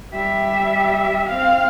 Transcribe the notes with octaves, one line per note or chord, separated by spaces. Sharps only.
G3 E5
C4 F5